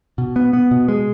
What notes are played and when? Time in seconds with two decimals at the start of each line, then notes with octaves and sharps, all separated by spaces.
0.18 B2
0.36 B3
0.53 B3
0.71 B2
0.88 G#3